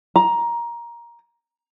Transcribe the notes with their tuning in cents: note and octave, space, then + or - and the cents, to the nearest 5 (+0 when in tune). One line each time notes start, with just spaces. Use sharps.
A#5 +15